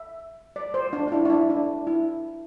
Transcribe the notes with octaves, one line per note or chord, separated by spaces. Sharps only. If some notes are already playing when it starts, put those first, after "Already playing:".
Already playing: E5
D5
C5
D4
D4
E4
D4
E4
D4
E4